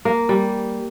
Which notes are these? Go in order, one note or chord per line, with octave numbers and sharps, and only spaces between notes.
A#3
G3